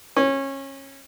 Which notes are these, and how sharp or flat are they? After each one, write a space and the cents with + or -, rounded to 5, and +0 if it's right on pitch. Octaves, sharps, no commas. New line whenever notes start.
C#4 -25